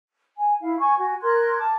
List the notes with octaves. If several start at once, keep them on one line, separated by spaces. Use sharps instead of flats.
G#5
E4 F5
G#5 C#6
F#4 G#5
A#4 C6 F#6 G#6
A5 D6